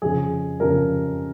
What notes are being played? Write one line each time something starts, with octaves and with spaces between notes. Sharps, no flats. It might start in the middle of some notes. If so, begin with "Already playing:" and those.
F2 C#3 G#4
F2 C#3 A#4